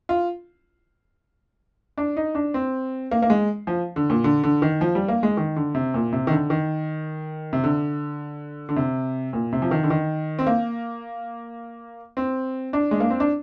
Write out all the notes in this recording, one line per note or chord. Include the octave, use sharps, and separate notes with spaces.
F4
D4
D#4
D4
C4
A#3
A#3
G#3
F3
D3
A#2
D3
D3
D#3
F3
G3
A#3
G#3
D#3
D3
C3
A#2
C3
D#3
D3
D#3
C3
D3
D3
C3
A#2
C3
F3
D#3
D3
D#3
C4
A#3
C4
D4
G#3
A#3
C4
D4